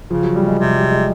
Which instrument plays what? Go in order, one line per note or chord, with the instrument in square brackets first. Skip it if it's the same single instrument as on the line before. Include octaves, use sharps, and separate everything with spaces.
[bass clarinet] C#3 [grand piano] F3
[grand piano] F#3
G3
G#3
[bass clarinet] C3
[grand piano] G3
G#3